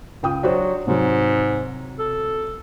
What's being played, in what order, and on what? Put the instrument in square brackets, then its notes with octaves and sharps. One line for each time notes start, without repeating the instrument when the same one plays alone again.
[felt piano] C#2 G5 D#6
[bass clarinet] F#3 [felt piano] D4 F#4 C5
[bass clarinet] G#2 [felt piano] C3 F#3
[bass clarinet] A4